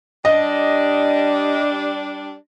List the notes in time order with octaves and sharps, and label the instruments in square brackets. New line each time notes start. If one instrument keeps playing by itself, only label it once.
[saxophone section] G3 D4 [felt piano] D#5